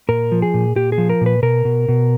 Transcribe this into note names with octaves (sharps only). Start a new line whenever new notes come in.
A#2 A#4
F3
G#4
A#2
A#2 G4
G#4
F3
A#4
A#2 B4
B2 A#4
B2
B2